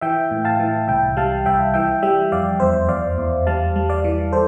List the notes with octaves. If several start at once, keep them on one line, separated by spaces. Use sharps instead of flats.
E3 E5 G5
A2
F5 A5
E3
C2 E5 G5
G3 F5 A5
C2 E5 G5
E3 E5 G5
G3 E5 G5
F2 D5 F5
E2 C5 E5
E2 D5 F5
E2
G3 F5 A5
G3
D5 F5
E3
A4 C5